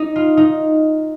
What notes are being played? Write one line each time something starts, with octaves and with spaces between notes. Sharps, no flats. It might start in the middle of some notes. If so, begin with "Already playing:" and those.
Already playing: D#4
F4
D#4